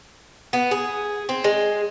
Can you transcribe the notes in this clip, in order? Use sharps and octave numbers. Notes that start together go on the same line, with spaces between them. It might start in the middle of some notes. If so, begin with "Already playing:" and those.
B3
G#4
C4
G#3